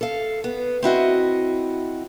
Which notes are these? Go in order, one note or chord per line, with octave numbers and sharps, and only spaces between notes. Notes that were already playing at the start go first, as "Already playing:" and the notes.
A4 F5
B3
C4 E4 F#4 D#5